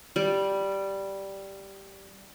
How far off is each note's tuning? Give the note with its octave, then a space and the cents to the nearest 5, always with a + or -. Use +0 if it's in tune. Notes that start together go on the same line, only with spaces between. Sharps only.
G3 -5